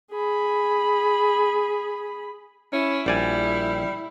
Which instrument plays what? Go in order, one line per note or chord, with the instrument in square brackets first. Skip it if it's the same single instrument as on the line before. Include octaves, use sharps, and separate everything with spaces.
[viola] G#4 B5
[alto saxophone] C#4 [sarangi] E4
[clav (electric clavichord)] A#1 D5 G#5 [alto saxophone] G3